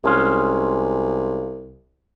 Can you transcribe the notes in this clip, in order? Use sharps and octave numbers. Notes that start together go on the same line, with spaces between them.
C2 G#3 C#4 F4